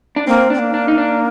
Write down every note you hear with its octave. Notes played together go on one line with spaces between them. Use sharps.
D4
A#3 C4
C4 D4
A#3
D4
D#4
D4